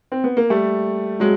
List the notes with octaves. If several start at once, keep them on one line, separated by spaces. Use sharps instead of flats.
C4
B3
A#3
G3 A3
F#3 G#3